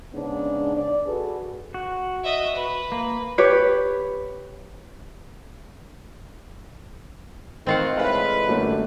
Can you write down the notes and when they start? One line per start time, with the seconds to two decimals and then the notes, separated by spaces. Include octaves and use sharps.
0.13 G#2 C#3 B3 D4
0.75 D5
1.05 F#4 G#4 A4 B4
1.74 F#4
2.24 D#5 E5
2.55 B4
2.92 A#3
3.38 G4 B4 C#5
7.67 D#3 C4 F4 F#5
7.97 E2 A2 G#3 E4 B4 E5 F5
8.48 F#2 D3 G3 A3 A#3